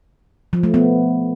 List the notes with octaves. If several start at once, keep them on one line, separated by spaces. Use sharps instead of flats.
F3
A3
B3